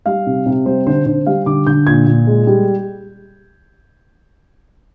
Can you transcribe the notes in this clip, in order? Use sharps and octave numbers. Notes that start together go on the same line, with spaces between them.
G3 F5
C3
C3
G3 C5
D3 C5
D3 C5
G3 F5
D3 D6
D3 G6
A#2 G#6
A#2
G#3
G3